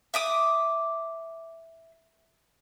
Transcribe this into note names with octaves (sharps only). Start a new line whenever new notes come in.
E5 D6 D#6